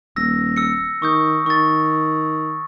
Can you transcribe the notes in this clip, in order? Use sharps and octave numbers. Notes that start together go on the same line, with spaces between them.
D#1 E6 A#6
E6 C#7
D#3 C#6 D#6 G6
D#3 C#6 A6